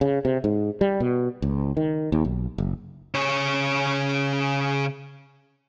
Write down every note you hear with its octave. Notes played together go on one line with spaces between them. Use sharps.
C#3
C3
G#2
G3
B2
C#2
D#3
D#2
B1
F#1
C#3 C#5